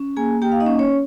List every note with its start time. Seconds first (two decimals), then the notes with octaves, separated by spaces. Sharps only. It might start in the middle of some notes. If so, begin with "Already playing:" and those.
Already playing: C#4
0.17 A#3 G#4 G#5
0.42 A#3 G4 G5
0.52 F5
0.60 D#4 D#5
0.66 C#4
0.79 C#4 C#5